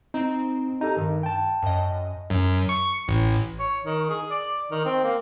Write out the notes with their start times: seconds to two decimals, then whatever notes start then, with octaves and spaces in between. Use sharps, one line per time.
0.14 C4 D#4
0.81 D#4 G4 A4 A#5
0.97 G2 D#3
1.23 G5 A5
1.63 F#2 D#5
2.30 F#2
2.69 C#6
3.08 A1
3.60 C#5
3.84 D#3
4.10 G#4
4.31 D5
4.71 D#3
4.85 C4
5.04 A#3